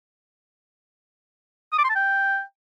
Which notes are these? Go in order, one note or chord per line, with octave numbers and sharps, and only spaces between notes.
D#6
D6
C6
A5
G5